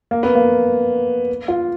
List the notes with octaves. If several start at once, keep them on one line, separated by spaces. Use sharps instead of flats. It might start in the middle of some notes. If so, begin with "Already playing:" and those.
A#3
B3
A#3
F4